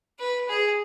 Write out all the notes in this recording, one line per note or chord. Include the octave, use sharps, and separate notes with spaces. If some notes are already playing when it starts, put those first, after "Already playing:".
B4
G#4